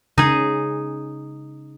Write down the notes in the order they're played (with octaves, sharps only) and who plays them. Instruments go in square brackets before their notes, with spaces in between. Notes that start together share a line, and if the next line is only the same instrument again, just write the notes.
[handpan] C#3 [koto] D#4 G#4